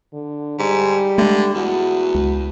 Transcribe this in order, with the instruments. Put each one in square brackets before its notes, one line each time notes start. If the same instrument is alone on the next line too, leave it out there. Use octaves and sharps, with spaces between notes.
[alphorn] D3
[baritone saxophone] G#2 [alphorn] G3
[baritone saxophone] D3 [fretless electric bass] G#3 A3
[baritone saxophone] E2 [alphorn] F#4
[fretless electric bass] C#2